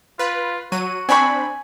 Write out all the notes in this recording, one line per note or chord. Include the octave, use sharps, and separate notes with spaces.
F4 B4
F#3 F#4 D#7
C4 D4 G#5 B5 C#6